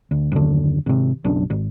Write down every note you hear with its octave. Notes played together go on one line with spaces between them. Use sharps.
D2
F#1 D#2 D3
G#1 C3
F#1 B1 F#2 D4
G#1